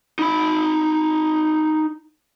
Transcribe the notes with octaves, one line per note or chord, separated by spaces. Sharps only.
D#4 B5